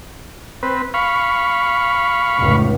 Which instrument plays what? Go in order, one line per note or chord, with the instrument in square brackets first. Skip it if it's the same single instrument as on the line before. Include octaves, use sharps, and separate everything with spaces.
[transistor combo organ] C4 B4
F5 B5 C#6
[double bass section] F1 C#2 A2